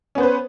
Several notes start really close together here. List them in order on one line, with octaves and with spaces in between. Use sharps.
C#4 B3 C5 B4